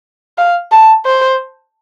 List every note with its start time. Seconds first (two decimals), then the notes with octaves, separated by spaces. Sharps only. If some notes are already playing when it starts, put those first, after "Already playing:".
0.38 F5
0.72 A5
1.06 C5